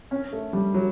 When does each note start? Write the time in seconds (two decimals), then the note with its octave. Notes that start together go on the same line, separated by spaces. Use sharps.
0.11 C#4
0.33 A3
0.53 G3
0.74 F#3